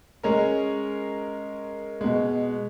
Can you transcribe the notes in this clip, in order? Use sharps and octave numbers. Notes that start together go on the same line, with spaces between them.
G#3 C#4 A#4
B2 G#3